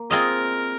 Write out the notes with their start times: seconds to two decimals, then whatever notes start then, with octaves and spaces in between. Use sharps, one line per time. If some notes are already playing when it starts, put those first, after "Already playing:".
Already playing: A#3
0.11 C4 F4 G#4 A#4 D#5